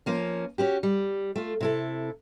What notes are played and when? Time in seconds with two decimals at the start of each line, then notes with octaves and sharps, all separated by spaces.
0.06 F3 A#3 C#4
0.58 C#4 F#4 G4
0.83 G3
1.36 A3 F4
1.60 C3 E4 A4